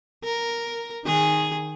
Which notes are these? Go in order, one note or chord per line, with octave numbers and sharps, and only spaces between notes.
A#4
D#3 G#4